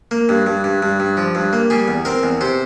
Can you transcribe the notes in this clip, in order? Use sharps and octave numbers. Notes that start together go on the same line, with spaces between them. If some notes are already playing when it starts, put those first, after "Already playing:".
A#3
G2
G2
G2
G2
G2
F3
G2
A#3
G3 G#4
E2
C4 A#4
E2
C3 C5